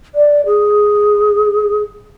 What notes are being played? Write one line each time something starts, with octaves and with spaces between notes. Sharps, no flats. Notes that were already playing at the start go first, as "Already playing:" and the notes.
D5
G#4